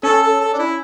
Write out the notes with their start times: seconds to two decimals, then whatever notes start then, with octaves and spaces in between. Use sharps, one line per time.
0.03 C#4 A4
0.23 A4
0.40 A4
0.53 D4
0.59 E4